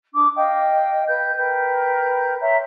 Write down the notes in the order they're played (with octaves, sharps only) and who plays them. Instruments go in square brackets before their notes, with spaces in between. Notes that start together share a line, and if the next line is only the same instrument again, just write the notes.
[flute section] D4 D6 D#6
D#5 F5 G5
B4 G6
A#4 B4 G5 G6
C#5 E5 A#5 C6